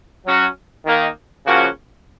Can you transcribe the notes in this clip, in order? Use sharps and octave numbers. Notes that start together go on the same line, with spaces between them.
F#3 C#4 F#4
D#3 A#3 D#4
C#3 F3 A#3 C#4 F#4